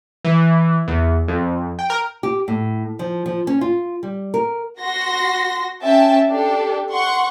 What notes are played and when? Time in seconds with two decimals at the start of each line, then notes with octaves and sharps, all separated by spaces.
0.24 E3
0.88 E2
1.28 F2
1.79 G5
1.90 A#4
2.23 G4
2.48 A2
2.99 F3
3.26 F3
3.47 C#4
3.61 F4
4.03 G3
4.34 A#4
4.81 F#4 C6 A#6
5.83 C#4 E5 G5 A5
6.30 D4 G4 A4
6.92 F#5 C6 C#6